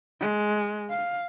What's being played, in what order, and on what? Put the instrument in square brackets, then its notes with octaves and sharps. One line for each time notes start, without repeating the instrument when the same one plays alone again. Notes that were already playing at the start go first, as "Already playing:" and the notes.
[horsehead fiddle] G#3
F5